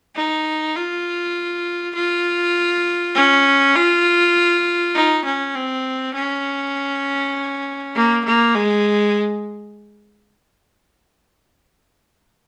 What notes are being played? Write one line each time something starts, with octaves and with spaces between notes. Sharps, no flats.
D#4
F4
F4
C#4
F4
D#4
C#4
C4
C#4
A#3
A#3
G#3